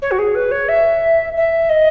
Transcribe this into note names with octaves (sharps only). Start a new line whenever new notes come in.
C#5
F#4
G#4
B4
C#5
E5
E5
D#5